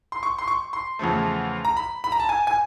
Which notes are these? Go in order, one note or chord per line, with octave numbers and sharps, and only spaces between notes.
C6
C#6
C6
C#6
C6
E2 C#3 F3 A3
A#5
B5
B5
A#5
A5
G#5
G#5